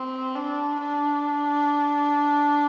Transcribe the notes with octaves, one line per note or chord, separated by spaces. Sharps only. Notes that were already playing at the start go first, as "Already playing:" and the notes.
Already playing: C4
D4
D4